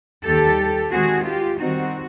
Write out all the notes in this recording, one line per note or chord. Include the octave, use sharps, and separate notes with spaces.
D#2 D#3 G3 G4 A4
D#3 G#3 C4 F#4 G#4
F4 G4
D#3 G3 C4 D#4 F#4